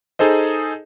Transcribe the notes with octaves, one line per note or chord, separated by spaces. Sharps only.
D#4 G#4 A4 C5 D#5